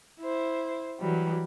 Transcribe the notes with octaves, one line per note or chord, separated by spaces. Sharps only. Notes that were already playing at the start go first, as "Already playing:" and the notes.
E4 C5
E3 F#3 G3